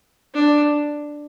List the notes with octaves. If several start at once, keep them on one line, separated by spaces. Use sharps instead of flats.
D4